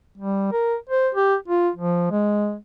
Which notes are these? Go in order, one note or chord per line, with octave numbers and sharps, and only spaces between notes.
G3
A#4
C5
G4
F4
F3
G#3